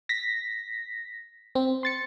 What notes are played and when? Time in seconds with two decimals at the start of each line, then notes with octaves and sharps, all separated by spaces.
0.09 A#6 B6
1.55 C4
1.83 C6 A6 C#7